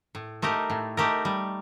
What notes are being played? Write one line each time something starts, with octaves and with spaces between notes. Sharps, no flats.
A2
A3 D#4 G4 A#4
A2
A3 D#4 G4 A#4
G3